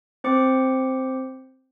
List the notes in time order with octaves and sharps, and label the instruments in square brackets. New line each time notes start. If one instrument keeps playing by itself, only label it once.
[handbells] C4 C5 D6 C#7